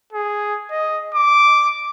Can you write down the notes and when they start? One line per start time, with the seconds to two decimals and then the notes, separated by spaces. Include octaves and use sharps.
0.13 G#4
0.71 D#5
1.14 D6